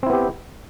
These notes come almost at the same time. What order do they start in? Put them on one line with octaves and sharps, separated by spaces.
C4 E4 B3 G4